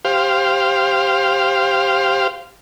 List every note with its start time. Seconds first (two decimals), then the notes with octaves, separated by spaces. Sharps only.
0.05 G4 C5 F5